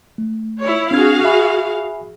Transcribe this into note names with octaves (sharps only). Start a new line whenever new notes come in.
A3
E4 C#5
C4 D4 F#4 G#4 F5 G#6
E5 G#5 B5